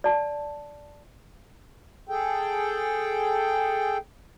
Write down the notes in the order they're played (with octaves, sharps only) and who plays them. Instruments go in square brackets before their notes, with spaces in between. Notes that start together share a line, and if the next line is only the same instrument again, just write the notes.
[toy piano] D5 A5
[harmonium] G#4 A4 G5